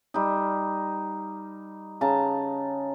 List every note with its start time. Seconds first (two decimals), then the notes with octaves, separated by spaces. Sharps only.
0.14 G3 D#4
2.01 C#3 A5 A#5